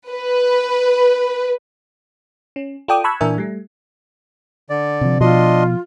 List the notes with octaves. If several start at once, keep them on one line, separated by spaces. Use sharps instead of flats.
B4
C#4
F4 A4 D5 G5 D6 D#6
A5 B5 C#6 E6 F#6 G#6
A#2 E3 D4 A#4 E5 G#5
G3 A3
D3 D5
C3 F3
B2 F3 D4 F4 D#5 C6